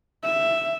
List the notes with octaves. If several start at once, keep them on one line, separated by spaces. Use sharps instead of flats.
E5